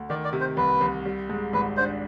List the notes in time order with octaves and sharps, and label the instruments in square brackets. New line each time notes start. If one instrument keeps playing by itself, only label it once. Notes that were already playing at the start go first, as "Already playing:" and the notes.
Already playing: [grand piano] D2
[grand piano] D#3 [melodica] D5
[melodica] D5
[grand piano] C3
[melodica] C5
[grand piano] C2 [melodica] B4
[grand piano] C2
G3
G#2
[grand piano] G#1 [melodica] B4
[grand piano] D4 [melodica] C5